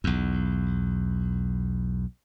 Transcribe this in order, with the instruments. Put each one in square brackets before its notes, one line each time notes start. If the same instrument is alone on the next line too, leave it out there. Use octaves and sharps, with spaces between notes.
[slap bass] B1 E2